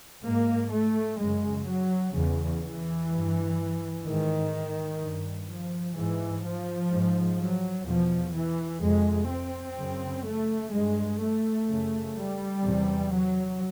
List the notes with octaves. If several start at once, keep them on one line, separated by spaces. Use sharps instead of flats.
G#2 A#3
A3
F#2 C#3 G#3
F#3
E2 C#3
E3
G2
G#2 D#3
G2
F3
G#2 E3
F3
G#2
F#3
E2 B2 F3
E3
F2 C3 G#3
C4
F#2 C#3
A3
G2 G#3
A3
F#2 C#3
G3
E2 C3
F#3